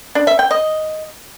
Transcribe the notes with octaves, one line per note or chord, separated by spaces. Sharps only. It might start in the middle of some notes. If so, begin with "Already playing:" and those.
D4
E5
G5
D#5